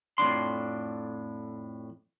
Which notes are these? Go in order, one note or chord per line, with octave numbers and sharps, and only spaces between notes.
F2 A2 D4 C6